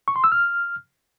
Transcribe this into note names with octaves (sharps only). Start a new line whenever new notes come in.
C#6
C6
E6
F6